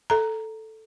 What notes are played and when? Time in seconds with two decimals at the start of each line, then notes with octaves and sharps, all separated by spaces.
0.10 A4 A#5